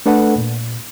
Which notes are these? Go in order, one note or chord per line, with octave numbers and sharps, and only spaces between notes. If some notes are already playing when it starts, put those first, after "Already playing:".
A3 D4 A4 B4 F#5
A#2